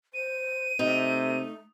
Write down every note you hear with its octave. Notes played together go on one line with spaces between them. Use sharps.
C5 D#7
C3 A3 D#4